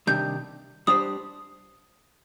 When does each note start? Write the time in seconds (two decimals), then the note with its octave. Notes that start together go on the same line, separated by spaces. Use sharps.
0.07 C3 D#3 G3 D4 G6
0.87 G3 D4 G4 C5 D#6